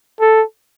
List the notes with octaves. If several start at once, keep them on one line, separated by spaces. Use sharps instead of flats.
A4